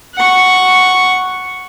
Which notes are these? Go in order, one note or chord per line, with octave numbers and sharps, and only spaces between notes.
F#5 C#6